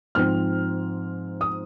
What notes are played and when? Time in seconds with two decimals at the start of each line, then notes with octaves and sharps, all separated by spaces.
0.15 G#2 F3 C4 F6
1.41 D#6